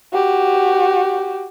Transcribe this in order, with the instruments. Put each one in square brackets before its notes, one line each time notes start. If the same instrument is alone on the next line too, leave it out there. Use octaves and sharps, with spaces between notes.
[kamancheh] F#4 G4